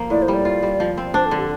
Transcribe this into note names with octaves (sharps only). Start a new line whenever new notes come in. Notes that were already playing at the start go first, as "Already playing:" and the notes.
Already playing: F3 A#3
A2 D5
C5
G3
D5
F4
G3
F3
C4
D4 C5
A4
D3
G4